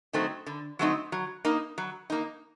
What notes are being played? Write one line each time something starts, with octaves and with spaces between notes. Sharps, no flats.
F#3 A3 C4 D#4
D3
F#3 A3 C4 D#4
F#3
A#3 D#4
F#3
A#3 D#4